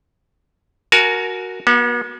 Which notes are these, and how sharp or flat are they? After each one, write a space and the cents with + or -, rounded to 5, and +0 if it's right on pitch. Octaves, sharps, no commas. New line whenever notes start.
F#4 +0 A#4 +0 G#5 +40
B3 -45 F#4 +0